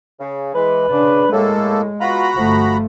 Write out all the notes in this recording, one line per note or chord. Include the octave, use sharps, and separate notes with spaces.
C#3
E3 G#3 B4
C#3 D4
A2 G#3 A#3 A4
B3 F4 F#4 A#5 B5
G1 F3 A3